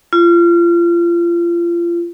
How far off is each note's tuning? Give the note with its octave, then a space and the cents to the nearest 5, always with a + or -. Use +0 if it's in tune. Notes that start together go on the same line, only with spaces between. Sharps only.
F4 -30